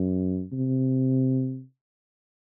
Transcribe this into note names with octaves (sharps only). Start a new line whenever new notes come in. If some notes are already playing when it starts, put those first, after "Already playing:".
Already playing: F#2
C3